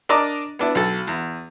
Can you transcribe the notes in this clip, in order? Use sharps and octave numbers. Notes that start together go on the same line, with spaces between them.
D4 A#4 D5 D#5 A#5 D6
B3 D4 E4
B1 A4
E2